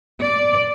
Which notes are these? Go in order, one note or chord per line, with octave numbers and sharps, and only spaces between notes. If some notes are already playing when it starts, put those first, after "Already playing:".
D5